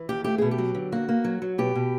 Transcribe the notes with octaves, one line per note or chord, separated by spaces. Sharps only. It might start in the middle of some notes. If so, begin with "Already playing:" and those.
Already playing: E3
D#2 G4
A3 G4
B2 G#4
G4
F#3
D3
A#3 F#4
A#3
F#3
F#3
B2 G4
B2